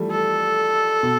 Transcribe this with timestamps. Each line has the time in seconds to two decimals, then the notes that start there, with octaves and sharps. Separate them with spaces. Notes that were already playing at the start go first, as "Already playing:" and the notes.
Already playing: E3 F3 G3 A3
0.11 A4
1.03 B2